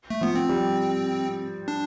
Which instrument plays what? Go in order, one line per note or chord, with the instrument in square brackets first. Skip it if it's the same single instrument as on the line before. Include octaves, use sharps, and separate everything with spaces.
[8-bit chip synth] A3
[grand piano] F3 [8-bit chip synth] B3
[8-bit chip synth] C4
[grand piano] G3
[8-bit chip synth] D4